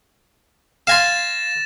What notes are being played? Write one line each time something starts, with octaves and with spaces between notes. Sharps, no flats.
F5 G#5 C6 A6 A#6 E7